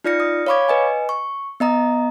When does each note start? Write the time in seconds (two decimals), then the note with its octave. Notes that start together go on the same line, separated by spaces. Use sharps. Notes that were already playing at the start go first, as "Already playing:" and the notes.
0.04 D#4 F4 D5 F6 A#6 C#7
0.20 D#6
0.47 C#5 F5 B5 C#6 D6 G#6
0.69 B4 D#5 G#5
1.09 C#6
1.60 B3 D#5 A#5 D#6